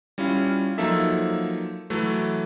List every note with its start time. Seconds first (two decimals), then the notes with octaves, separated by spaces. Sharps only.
0.18 G3 C#4 E4 F4
0.78 F3 F#3 A#3 D#4 A4 E5
1.90 E3 F#3 A3